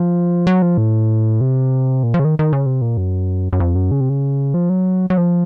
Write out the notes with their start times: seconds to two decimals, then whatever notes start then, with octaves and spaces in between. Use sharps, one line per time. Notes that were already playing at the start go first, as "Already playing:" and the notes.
Already playing: F3
0.47 F#3
0.62 F3
0.78 A2
1.41 C3
2.03 A#2
2.14 F3
2.19 C#3
2.25 D#3
2.39 D#3
2.53 C#3
2.66 C3
2.82 A#2
2.97 F#2
3.53 F#2
3.60 F2
3.75 F#2
3.91 C#3
4.01 C3
4.09 C#3
4.54 F3
4.69 F#3
5.10 F#3
5.17 F3